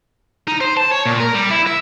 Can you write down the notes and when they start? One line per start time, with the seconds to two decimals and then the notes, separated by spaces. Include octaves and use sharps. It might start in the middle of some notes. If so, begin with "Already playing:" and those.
0.48 D#4
0.61 C5
0.77 A5
0.91 C#5
1.06 A#2
1.20 A#4
1.34 G3
1.50 E4
1.67 E5